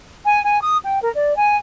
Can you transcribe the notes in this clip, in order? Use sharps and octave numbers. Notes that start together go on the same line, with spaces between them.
G#5
G#5
D#6
G5
A#4
D5
G#5